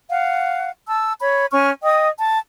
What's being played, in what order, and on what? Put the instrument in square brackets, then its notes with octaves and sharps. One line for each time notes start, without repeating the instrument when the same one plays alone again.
[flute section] F5 F#5
A5 E6
C#5 B5
C#4 C#6 F6
D#5 G5 D#6
A5